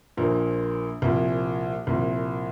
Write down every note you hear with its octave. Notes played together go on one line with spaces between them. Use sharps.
A#1 A#2 F3 A#3
C2 A#2 F3
C2 A#2 F3